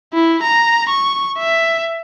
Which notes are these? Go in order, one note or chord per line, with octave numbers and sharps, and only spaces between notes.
E4
A#5
C#6
E5